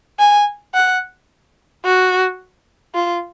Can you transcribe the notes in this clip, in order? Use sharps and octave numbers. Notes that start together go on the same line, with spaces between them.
G#5
F#5
F#4
F4